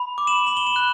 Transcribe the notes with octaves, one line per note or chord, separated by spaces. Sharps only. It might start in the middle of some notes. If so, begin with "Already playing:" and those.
Already playing: B5
D6
E7 F#7
B5 F#7
G7
E7 F#7
F#6